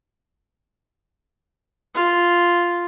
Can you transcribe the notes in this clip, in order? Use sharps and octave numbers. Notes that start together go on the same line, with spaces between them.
F4